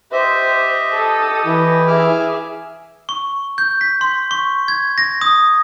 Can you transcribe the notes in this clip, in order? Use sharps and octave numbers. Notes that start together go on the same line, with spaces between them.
G4 C5 D#5 E5
A4 D#6
E3 E4
G#4 E5 D6 F6
C#6
G6
B6
C6
C#6
G#6
A#6
D#6